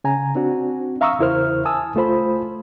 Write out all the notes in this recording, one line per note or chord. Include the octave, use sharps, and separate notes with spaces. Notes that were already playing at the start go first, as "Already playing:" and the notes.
C#3 G#5 A#5
C4 D4 F#4
E5 F5 A#5 C#6 D#6 E6
E2 C#3 E4 A#4 C5 F6
G#5 A5 D#6 E6
C#2 A3 F4 C5 B5